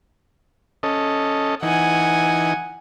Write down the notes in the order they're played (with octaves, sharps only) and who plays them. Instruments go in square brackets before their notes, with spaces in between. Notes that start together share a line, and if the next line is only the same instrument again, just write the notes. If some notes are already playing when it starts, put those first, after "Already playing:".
[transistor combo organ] C#4 A4 D#5
[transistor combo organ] E3 D#4 [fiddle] F#5 G#5